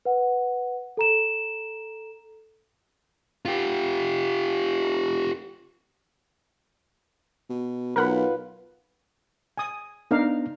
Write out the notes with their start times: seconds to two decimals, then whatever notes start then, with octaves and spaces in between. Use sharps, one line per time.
0.05 B4 F#5
0.97 A4 A#5 E7
3.45 F4 G4
7.49 B2
7.96 B1 F4 A#4 B4 F#5 B5
9.58 G#5 D#6
10.11 B3 D4 D#4 A#4 F5